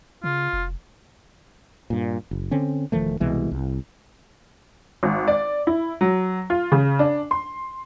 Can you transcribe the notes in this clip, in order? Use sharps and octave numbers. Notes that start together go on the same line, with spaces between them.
C#3 F4
F1
G2 A#2
F#1
D3 C4 C#4
E1 D#3 F3 A3
C2 B2 E3 G#3
C2
G#1
D5
E4
F#3
F4
C#3
D4
C6